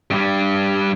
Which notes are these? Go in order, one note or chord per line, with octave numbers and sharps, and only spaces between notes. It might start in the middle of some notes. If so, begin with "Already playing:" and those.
G2 G3